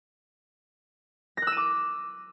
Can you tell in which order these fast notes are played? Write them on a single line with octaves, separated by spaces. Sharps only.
A#6 F#6 E6 D#7 D6